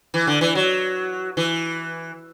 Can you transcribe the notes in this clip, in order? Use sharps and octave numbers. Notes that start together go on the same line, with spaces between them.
E3
D3
E3
F#3
E3